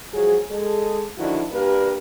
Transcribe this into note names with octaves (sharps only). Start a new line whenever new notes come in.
F3 F#3 G#3 G#4
G#3 G#4 A4
D3 D#3 F3 D4 E4 F#4
G2 A#3 D4 G4 A#4 B4